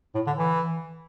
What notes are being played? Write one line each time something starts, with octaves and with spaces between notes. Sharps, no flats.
A2
D3
E3